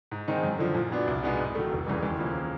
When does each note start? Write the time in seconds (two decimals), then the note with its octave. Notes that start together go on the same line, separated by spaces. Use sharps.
0.11 G#2
0.28 D#3 G#3 C4 D#4
0.43 F#2
0.59 D3 F3
0.75 A#2
0.91 F#3 B3 D4
1.07 C2
1.23 B2 G#3 B3 D#4
1.39 G#2
1.55 D#3 F#3 A3
1.72 F1
1.87 E2 C#3 E3 G3
2.03 D#2
2.19 C#3 F3 A#3